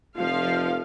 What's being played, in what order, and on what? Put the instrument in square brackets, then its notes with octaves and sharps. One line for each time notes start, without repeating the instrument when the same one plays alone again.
[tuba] F1 [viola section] F3 F5